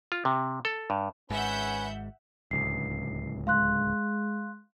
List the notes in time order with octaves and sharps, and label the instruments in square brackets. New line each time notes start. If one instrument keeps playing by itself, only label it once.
[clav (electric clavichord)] F4
C3
A4
G2
[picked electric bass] G#1 G#2 [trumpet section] C#4 B4 G#5 [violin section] E5 F#5 G6
[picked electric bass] D1 C#2 [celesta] C7
[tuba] G#3 [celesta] F5 C6 F#6